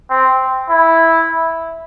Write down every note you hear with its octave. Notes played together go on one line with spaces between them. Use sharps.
C4
E4